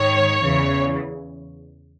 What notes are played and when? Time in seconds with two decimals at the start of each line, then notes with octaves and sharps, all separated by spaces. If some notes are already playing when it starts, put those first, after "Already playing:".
Already playing: G#2 D#3 C#5
0.41 E2 C#3 E3